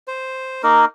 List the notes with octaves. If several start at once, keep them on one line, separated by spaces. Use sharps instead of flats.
C5
A#3 D#4 A#4